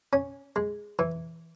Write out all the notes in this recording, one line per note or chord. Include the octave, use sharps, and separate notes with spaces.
C#4
G#3
E3